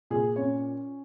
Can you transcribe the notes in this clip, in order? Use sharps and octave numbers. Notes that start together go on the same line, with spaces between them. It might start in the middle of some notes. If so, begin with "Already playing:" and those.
A#2 G#4
C#4 C#5